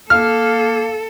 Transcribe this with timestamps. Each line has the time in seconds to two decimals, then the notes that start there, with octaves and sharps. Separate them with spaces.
0.10 A#3 A4 F5 F6